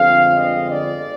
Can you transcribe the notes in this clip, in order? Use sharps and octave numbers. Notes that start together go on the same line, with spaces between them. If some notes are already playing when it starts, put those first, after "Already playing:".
Already playing: G1 F2 D3 G#3 C4 F5
D#5
D5